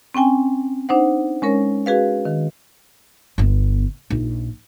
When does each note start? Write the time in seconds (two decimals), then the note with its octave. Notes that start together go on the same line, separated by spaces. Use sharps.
0.14 C4 C#4 G5 G#5
0.89 D4 D#4 C5 F#5
1.42 G#3 C#4 A#4 C#5
1.86 F#4 G#4 B4 F5
2.25 D#3
3.38 G1 B3
4.10 A#1 D#4